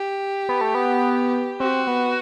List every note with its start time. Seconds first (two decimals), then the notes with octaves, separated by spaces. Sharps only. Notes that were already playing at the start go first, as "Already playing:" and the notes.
Already playing: G4
0.49 B3
0.61 A3
0.75 B3
1.60 C4 F#4
1.87 B3